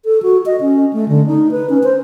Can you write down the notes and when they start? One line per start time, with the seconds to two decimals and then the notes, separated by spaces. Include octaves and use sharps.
0.05 A4
0.23 F#4
0.46 D#5
0.61 C#4
0.93 A3
1.08 D3
1.27 D#4
1.51 B4
1.70 C#4
1.83 C5